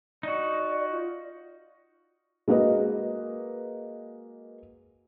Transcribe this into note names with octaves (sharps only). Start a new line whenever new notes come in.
D#4 F#4 D5
F4
G#3 A#3 F#4 B4 D#5